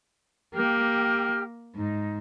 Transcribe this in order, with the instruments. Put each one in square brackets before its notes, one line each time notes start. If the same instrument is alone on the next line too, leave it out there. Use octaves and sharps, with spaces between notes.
[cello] A#3 [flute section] G4 G5 F6
[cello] G#2 [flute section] D#4